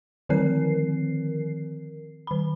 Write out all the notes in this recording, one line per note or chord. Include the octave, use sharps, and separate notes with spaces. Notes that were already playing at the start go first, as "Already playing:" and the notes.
D3 D#3 F3 C4 A#4 C7
D#3 B5